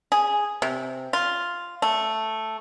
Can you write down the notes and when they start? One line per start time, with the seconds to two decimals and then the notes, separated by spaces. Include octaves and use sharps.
0.12 G#4
0.62 C3
1.13 F4
1.82 A3